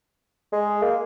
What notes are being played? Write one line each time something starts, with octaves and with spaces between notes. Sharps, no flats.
G#3
A#3